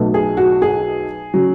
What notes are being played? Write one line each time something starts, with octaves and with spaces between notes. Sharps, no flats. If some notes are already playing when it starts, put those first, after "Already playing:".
Already playing: B1 B2 A3
G#4
F#4
G#4
C#3 F#3